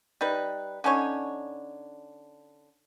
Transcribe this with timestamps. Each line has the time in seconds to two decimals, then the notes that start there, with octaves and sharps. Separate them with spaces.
0.21 G3 D#4 B4
0.84 D3 C#4 D#4 C#5